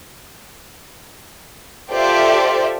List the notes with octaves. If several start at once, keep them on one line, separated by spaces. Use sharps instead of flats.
F4 G4 A4 C5 D5 E5